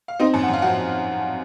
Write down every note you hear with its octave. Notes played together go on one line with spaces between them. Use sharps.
F5
C4 D#4 D#5
F#2 A5
F#5
F#2
F5
F3 F#4 F#5